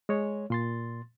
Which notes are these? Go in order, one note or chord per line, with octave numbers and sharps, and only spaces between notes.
G#3 C#5
A#2 C6 A6